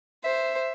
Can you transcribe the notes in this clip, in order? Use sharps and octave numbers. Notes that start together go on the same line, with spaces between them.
C5 E5